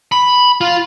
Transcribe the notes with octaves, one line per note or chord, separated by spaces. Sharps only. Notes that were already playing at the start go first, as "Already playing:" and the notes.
B5
F4